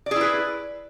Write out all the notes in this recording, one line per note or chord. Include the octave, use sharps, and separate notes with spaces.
E4 G#4 B4 D5